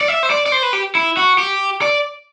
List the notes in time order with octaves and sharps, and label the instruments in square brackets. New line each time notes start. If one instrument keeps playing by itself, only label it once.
[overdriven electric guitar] D5
E5
C5
D5
D5
C5
B4
G4
E4
F#4
G4
D5